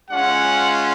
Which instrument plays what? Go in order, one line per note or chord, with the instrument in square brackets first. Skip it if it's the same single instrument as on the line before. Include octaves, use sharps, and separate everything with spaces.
[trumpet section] G#3 C#4 F4 F#5